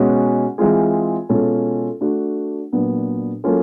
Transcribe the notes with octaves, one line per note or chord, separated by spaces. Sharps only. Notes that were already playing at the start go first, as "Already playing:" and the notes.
Already playing: B2 G#3 C#4 F#4
E3 G#3 C4 F4 G#4
B2 G#3 C#4 F4 A4
A3 D4 F#4
A#2 F#3 B3 D4
F#3 A#3 C#4 F4 A4